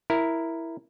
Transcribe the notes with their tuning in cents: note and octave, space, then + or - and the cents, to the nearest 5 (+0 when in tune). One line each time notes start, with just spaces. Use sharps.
E4 +0 A#4 +0